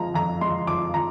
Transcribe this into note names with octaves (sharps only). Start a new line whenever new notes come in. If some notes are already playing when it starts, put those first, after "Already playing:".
Already playing: F3 G#3 A#5
F2 A#5
G#3 C6
F3 D6
F3 A#5